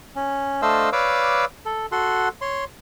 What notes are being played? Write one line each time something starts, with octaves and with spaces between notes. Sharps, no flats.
C#4
A3 D4 C5 D#5 F5 E6
B4 C#5 D5 F5 D6 E6
A4
F#4 A4 F#5 C6
C#5 C6